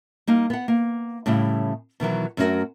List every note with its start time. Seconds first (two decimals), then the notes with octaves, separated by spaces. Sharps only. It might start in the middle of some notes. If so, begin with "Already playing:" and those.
0.27 G3 A#3 D#4
0.50 B3 F#5
0.68 A#3
1.26 A2 C#3 G3 E4
2.00 B2 D#3 E3 F#3
2.37 F#2 A3 C#4 D4 F#4 A#4